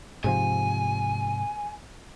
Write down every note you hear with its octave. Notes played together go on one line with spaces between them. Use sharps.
G#2 C3 F3 G#5